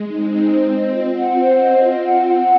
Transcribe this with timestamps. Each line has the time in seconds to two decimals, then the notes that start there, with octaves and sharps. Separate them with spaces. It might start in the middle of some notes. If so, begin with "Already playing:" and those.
Already playing: G#3
0.08 C4 D#4
0.30 D#4
0.52 C5
0.74 D#5
0.96 F4
1.18 F#5
1.39 C4 C5
1.61 D#5
1.83 F4
2.04 F#5
2.26 F#5